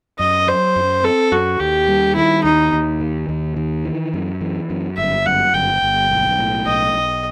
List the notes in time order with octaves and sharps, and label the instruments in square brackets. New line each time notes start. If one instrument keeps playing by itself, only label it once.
[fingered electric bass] F#2 [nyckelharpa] D#5
[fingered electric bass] F#3 [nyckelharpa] C5
[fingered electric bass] F#2
[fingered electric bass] C4 [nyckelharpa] A4
[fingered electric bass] F#2 [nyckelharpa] F#4
[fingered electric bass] D#2 [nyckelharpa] G4
[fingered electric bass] G3
[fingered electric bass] D#3 [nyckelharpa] E4
[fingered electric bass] D#2 [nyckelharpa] D#4
[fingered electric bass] D#2
D#3
D#2
D#3
E3
F#2
E3
F#2
[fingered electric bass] G1 [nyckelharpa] E5
[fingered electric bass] F#2 [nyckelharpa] F#5
[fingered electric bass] G1 [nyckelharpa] G5
[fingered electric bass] G1
B1
A2
[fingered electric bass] B1 [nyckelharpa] D#5
[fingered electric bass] B1